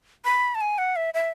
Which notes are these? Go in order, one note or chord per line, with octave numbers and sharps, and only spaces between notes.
B5
A5
G#5
F#5
E5
E5